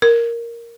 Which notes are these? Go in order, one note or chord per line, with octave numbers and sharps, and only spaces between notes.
A#4